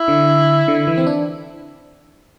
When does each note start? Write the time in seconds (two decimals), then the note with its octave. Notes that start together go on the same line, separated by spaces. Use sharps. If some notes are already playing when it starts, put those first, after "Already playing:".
Already playing: E4
0.08 D3
0.68 D3
0.87 E3
0.97 C4
1.07 D4